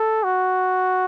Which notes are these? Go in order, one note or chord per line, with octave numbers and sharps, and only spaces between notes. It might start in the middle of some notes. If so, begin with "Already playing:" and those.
Already playing: A4
F#4